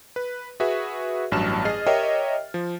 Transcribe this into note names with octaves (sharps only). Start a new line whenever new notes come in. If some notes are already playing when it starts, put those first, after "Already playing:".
B4
F#4 G#4 B4 E5
A1 G2 F#3 A5 F6 E7
G#4 D#5 F6 A6 C7
G4 A#4 C#5 D#5 E5 G5
F3